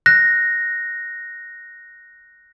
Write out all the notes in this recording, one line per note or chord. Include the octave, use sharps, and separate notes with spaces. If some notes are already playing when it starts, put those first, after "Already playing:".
F#6 A#6